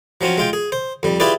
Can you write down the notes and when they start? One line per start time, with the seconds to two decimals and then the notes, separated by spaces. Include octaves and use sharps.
0.21 F3 F#3 C4 C#4 F4
0.38 G#3 F4 G5
0.53 G#4
0.72 C5
1.03 F2 G3
1.20 E4 F4 G4 G#4 B4 D5